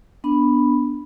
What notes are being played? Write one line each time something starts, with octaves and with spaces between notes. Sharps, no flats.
B3 D4 B5